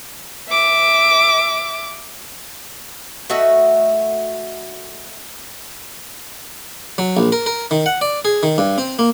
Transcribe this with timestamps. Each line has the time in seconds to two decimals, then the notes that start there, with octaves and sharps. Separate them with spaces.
0.49 E5 D6
3.30 A3 F#4 D#5 E5
6.98 F#3
7.17 A#1
7.32 A#4
7.46 A#4
7.71 D#3
7.86 F#5
8.01 D5
8.25 G#4
8.43 D#3
8.58 G2
8.78 C4
8.99 A#3